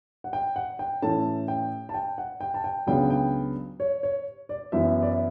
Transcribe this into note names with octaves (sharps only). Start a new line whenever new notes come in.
F#5
G5
F#5
G5
A2 E3 A3 C#4 A5
G5
A5
G5
F#5
G5
A5
G5
C#2 C#3 F#3 B3 D4 G5
G5
C#5
C#5
D5
F#2 E3 B3 E4 E5
D5
E5